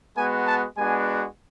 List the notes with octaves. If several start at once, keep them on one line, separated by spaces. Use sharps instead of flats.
G#3 B3 F#4 G#5
A5
G#3 B3 D4 F#4 G#5